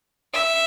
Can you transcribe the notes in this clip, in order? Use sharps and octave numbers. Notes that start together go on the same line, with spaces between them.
E5